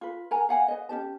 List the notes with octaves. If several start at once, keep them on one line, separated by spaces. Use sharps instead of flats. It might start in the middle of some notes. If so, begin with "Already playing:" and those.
F4 B4
A#4 F#5 G#5 A#5
F5 F#5 G#5
B4 D#5
C#4 F#4 G4 A5